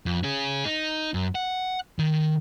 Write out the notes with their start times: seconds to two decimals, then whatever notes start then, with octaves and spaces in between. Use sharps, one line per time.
0.06 F2
0.23 C#4 G#4
0.65 D#4
1.14 F#2
1.35 F#5
1.99 D#3